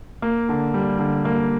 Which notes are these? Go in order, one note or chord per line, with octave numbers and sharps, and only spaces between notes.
A#3
D3
G3
D3
A#3